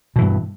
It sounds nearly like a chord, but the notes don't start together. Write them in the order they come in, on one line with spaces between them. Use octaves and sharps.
B2 E3 G2